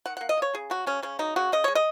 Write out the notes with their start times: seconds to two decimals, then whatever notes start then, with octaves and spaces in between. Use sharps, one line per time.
0.06 D#3 F#5
0.17 A#3 F#5
0.29 D#5
0.37 A#3 C#5
0.54 C#3 G#4
0.70 F#3 F#4
0.86 C#3 C#4
1.03 C#3 C#4
1.19 F#3 D#4
1.36 C#3 F#4
1.52 C#3 D#5
1.64 G#3 C#5
1.75 D#5